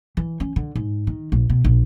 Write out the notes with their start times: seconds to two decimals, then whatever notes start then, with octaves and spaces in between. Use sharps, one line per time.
0.17 E3
0.40 C#4
0.56 D3
0.75 G#2
1.07 D#3
1.32 A#1
1.50 B2
1.64 A#1